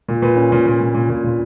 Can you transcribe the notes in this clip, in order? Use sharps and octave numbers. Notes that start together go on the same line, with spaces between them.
A#2
A#2 B4
C#4
A#2
A#2
A#2
A#2
A#2
A#2